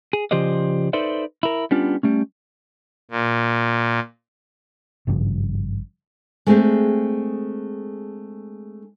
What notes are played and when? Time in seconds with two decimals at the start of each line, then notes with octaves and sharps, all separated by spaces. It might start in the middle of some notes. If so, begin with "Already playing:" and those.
0.13 G#4
0.31 C#3 F3 G4 C5 D5 D#5
0.93 D#4 A4 B4 C5 D5 E5
1.43 E4 A#4
1.71 G3 B3 C#4 D4 F4
2.03 G3 A3 C#4
3.11 A#2
5.07 G#1 G2 C#3 F3
6.47 G#3 A3 C4 D4 G4 G#4